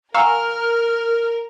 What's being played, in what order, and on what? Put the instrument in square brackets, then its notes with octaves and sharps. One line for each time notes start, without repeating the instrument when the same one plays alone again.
[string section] A#4 [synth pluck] F5 C#6 E6 [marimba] F#5 G#5 A#5 [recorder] F6